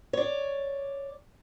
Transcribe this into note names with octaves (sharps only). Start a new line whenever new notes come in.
C#5 D5